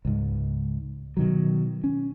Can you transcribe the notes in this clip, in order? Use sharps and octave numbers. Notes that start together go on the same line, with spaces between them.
C#2 G#2
B2 D#3 F#3
C#4